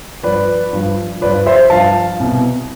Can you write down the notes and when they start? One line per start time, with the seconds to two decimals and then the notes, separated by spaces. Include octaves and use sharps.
0.23 G2 F3 B4 D5
0.73 G2 F3
1.21 F3 B4 D5
1.25 G2
1.46 C5 E5
1.70 G2 F3 F5 A5
2.20 C2 B2